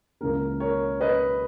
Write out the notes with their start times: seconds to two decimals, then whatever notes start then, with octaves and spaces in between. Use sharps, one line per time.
0.21 C#2 C#3 E3 A#3 A#4
0.60 A#4 C#5
1.01 B4 D#5